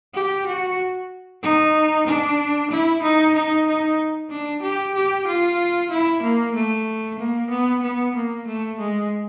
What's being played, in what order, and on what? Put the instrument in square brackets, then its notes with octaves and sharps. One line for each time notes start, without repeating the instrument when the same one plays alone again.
[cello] G4
F#4
D#4
D4
E4
D#4
D#4
D#4
D4
G4
G4
F4
E4
A#3
A3
A#3
B3
B3
A#3
A3
G#3